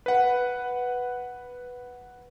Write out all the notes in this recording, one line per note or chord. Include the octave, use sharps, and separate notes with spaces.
B4 F#5